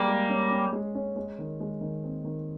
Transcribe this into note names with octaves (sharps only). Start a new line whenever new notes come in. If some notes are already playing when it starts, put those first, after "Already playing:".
Already playing: G3 A#3 G#4
G#3
C#4
C#4
G#3
C#4
G#3
D#3
G#3
D#3
C4
D#3